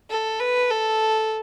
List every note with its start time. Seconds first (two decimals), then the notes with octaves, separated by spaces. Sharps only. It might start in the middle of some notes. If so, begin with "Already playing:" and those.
0.11 A4
0.40 B4
0.71 A4